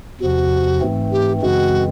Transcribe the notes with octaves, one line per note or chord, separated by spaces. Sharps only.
E2 C3 F3 F#4
G#2 E3 A3 C4
G4
F#2 C#3 E3 G#3 C4 F#4